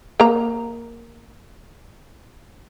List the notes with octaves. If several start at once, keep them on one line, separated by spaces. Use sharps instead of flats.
A#3 A#5